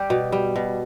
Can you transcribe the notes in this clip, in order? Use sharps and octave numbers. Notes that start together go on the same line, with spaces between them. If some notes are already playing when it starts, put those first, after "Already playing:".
Already playing: G3 G4
B2
G3
B2